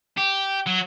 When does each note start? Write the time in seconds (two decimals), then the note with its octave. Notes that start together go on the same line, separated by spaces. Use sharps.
0.17 G4
0.66 F#3